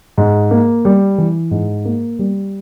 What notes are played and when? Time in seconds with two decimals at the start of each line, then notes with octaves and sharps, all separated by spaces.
0.18 G#2
0.51 A#3
0.85 G3
1.18 E3
1.51 G#2
1.85 A#3
2.19 G3